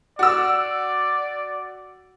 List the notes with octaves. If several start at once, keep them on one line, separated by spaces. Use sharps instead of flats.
F#4 D5 E6